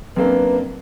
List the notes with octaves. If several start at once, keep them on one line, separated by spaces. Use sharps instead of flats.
F#2 A#3 C4 D4 B4